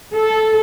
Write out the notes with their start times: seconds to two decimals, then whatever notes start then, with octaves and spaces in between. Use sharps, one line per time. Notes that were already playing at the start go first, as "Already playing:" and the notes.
0.15 A4